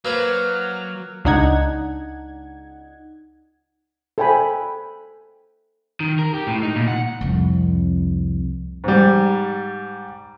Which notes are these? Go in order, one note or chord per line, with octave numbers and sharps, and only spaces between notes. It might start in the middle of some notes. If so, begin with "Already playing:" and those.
F#3 A#3 B4 C5 F6
C#2 D4 D#4 F#5 G#6
A4 C5 G5 G#5 B5
D#3
A#4
G4
A2
D#4
A#2
F#5
C2 F2
G#2 G3